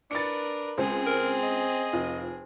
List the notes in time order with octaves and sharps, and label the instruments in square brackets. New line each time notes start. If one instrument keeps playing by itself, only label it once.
[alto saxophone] D4 [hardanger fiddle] A#4 B4 [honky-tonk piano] A6 C#7
[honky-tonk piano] C#2 G#3 C5 [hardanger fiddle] C4 G#4
[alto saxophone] A#4
D#5
[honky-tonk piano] F1 F4